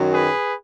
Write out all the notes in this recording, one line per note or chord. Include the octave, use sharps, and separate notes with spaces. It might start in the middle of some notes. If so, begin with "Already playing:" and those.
Already playing: F#2 D#3 F#3
G#4 B4